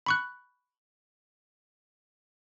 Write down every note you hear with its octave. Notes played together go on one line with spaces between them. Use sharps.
B5 C#6 F#6